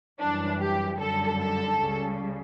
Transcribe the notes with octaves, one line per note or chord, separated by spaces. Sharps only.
F#2 E3 G3 D4
G4
F#2 D3 G3 A4
A4
C#2 C#3 G3